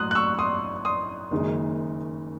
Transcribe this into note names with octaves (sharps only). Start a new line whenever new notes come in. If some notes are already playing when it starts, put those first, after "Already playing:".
Already playing: A1 A2 F#3 C6 D#6 F#6
F#6
C#6 E6
C6 D#6
C6 D#6
F#1 F#2 D#3 G#3